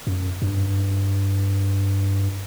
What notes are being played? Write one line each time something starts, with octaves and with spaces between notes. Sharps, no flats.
F#2
G2